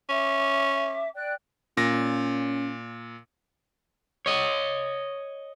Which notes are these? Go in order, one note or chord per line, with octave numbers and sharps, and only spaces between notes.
C#4 E5 D6
D5 G5 F#6
A#2 C#4 A#6
C#5 D#5